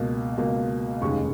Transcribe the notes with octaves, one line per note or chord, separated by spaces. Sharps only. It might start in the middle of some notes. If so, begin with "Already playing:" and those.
Already playing: C#2 B2 A#3
C#2 B2 A#3
F1 D#2 C#3 G#3 C#6